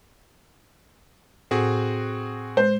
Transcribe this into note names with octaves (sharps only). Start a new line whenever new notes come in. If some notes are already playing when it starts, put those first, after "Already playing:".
A2 C4 F#4 G#4
G#3 C5